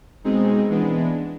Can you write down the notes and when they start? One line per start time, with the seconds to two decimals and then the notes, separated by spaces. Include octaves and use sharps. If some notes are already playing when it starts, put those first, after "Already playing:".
0.24 B2 G#3 C4 D#4 G#4
0.70 E3 G#3 B3 D4